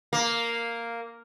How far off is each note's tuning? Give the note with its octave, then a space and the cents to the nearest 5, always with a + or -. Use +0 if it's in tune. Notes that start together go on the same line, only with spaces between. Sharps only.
A#3 -5